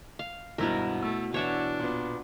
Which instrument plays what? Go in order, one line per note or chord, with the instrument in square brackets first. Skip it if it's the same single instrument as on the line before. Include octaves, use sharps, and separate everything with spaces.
[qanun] F5
[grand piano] G#1 G2 E6 [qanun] B2 E4 A#4
[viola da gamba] A3 [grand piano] E6
[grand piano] E3 [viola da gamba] D4 [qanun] C#5 E5 F#5
[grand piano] A#2 B3